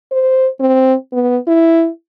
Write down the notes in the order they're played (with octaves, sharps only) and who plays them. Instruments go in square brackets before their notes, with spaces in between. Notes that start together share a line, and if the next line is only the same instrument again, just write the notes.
[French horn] C5
C4
B3
E4